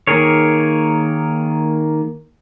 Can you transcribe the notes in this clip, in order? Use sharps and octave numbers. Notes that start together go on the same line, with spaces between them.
D#3 A#3 G#4 A#4 C#5